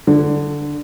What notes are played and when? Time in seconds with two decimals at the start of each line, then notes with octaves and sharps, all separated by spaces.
0.07 D3